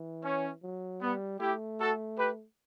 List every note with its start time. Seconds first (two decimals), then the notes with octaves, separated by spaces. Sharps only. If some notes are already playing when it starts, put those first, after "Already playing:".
Already playing: E3
0.24 C#4
0.63 F#3
1.01 G3 B3
1.40 A3 E4 G4
1.79 F#4 A4
2.18 G4 B4